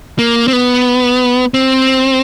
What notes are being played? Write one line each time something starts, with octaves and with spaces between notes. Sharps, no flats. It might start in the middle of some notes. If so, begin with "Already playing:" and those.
A#3
C4
B3
C4